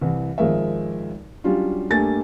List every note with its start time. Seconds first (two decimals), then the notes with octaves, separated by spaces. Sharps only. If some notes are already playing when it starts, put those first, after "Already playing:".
0.01 C2 E3
0.38 G#1 F3 G#3 A#4 E5
1.44 F#3 G3 C#4 D4 F4
1.90 G2 A3 A#3 G4 G#5 A6